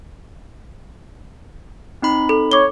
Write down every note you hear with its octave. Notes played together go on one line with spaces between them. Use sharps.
C4 D#4 B5
A4
C#5 D6 G7